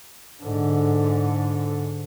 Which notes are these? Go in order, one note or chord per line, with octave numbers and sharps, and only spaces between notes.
G#2 D3